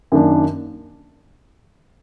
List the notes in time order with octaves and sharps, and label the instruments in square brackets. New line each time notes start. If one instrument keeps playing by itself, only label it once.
[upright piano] F#2 D#3 A#3 D4